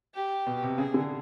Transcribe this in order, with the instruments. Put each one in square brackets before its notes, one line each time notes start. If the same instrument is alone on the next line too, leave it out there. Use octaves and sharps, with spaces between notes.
[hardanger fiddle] G4
[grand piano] B2
C3
[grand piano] C#3 [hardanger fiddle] G#4
[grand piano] D3